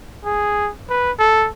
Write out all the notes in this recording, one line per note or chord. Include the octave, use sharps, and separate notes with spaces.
G#4
B4
A4